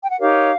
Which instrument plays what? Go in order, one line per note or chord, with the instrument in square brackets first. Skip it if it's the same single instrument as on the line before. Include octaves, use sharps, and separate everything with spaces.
[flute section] G5
F#5
D#4 G4 A#4 C#5 F5